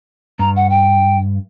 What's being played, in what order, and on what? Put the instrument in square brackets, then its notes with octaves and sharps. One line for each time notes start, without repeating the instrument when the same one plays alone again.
[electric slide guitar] G2 [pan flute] A#5
[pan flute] F#5
G5